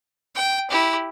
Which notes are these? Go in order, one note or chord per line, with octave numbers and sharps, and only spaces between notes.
G5
E4 G4